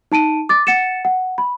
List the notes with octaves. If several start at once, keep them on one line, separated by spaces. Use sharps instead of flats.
D#4 A5 D7 D#7
D6 A6
F#5 A6 C#7 E7
F#5
B5